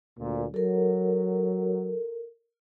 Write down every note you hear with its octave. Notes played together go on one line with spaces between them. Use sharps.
D2 A#2
F#3 A4 A#4